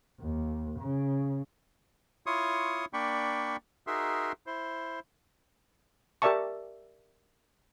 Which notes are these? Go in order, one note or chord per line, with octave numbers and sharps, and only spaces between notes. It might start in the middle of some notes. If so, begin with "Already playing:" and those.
D#2
C#3
E4 F4 C#5 C6 C#6 D#6
A#3 D4 D5 G5 B5 C#6
D#4 F#4 G#4 A#4 E5 C6
E4 C5
G4 A#4 D5 E5 A5 C#6